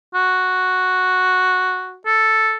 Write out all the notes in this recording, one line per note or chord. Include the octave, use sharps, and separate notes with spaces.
F#4
A4